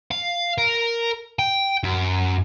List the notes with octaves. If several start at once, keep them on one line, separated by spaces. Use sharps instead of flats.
F5
A#4
G5
F#2